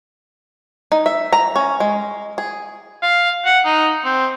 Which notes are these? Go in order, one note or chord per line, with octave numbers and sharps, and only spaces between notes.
D#4
E5
A#5
C#4
G#3
G#4
F5
F#5
D#4
C4